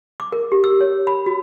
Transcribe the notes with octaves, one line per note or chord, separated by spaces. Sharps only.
D6
A#4
G4
E6
C#5
B5
F#4